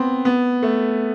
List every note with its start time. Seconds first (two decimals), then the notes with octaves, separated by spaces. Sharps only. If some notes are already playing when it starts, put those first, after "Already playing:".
Already playing: B3 C4
0.25 B3
0.63 A3